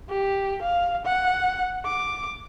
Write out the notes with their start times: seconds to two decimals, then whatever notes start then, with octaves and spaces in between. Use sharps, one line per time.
0.10 G4
0.62 F5
1.06 F#5
1.86 D6